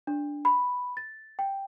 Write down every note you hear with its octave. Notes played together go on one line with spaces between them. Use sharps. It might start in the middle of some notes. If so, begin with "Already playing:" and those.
D4
B5
A6
G5